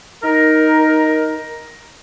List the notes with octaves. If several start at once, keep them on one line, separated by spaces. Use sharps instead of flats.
D#4 A#4